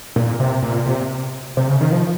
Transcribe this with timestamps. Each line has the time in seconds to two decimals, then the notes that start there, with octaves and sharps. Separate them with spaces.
0.16 A#2
0.40 C3
0.63 A#2
0.86 C3
1.57 C3
1.68 C#3
1.81 D#3
1.92 F3